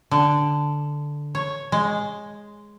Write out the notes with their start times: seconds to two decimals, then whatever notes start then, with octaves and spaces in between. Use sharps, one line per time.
0.11 D3
1.35 C#5
1.72 G#3